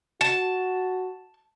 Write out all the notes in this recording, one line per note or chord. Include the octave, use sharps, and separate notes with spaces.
F#4 A5